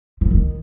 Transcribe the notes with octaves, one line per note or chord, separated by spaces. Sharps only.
F3
D#3